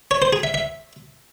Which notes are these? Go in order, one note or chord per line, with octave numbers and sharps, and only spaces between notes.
C#5
C5
G#4
E5
E5